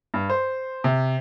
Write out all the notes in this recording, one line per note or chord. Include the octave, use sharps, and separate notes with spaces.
G2
C5
C3